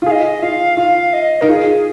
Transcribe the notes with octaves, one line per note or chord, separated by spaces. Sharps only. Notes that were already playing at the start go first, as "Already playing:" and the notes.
F4
G#4 D#5 F5
F4 F5
F4 F5
D#5
D#4 A#4
F4 G#4